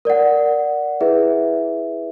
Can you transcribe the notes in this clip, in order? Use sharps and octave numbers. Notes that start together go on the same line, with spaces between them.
A#4 D5 F#5
E4 G#4 B4 E5